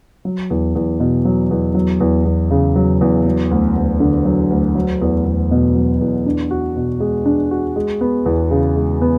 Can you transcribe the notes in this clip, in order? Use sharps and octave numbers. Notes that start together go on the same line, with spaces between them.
F#3
E2
E2
B2
F#3
E2
F#3
E2
E2
C#3
F#3
E2
F#3
D2
D2
D3
F#3
D2
F#3
E2
E2
B2
F#3
E2
D4
F#4
B2
G#3
D4
F#4
G#3
B3
E2
C#3
G#3
B3